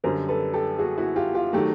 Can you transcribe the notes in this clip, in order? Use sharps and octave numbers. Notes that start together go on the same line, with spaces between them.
F#2 D3 G3 A#4 C5
A4 B4
G4 A4
F#4 G#4
E4 F#4
F4 G4
F4 G4
D#3 F#3 A3 G4